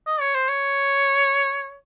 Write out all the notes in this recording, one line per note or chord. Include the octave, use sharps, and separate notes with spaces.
D#5
C#5
C5
C#5